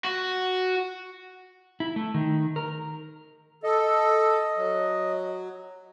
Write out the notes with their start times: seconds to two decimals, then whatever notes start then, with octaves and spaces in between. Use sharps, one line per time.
0.05 F#4
1.80 E4
1.96 A3
2.14 D#3
2.56 A#4
3.63 A4 D#5
4.57 F#3